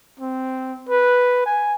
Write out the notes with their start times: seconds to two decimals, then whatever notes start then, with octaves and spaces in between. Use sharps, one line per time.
0.19 C4
0.89 B4
1.46 G#5